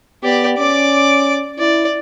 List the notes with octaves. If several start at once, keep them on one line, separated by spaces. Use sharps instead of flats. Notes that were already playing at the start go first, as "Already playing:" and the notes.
B3 G4 D5
C#4 D5 D6
E4 D5